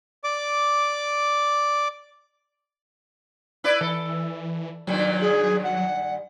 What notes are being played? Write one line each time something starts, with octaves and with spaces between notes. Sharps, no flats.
D5 D6
E4 B4 D5
E3 A4
G2 A#2 D#3 F#3
G#4
F#5